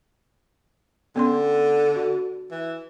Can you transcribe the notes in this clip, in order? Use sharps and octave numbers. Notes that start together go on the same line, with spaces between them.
D3 B3 C#4 C6
F#4
E3